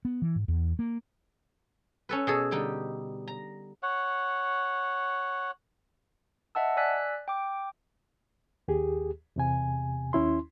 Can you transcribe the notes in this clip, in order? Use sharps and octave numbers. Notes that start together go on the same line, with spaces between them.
B3
E3
G#2
E2
A#3
C#4 A4 B4
B2 G#4 A4
D3 G3 D#4 G4
A#5
C#5 F#5
D#5 E5 F#5 A5 E6
D5 G#5 E6 F#6 B6
G5 D6
D#2 G4 G#4
E2 C3 G#5
D#2 C#4 E4 C6